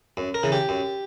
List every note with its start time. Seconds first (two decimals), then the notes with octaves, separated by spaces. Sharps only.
0.17 F#2
0.34 A#4
0.43 C#3 E3
0.52 G4
0.69 F#2